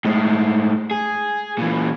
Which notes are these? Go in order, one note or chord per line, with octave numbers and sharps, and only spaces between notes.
A2 G#3
G#4
A#2 E3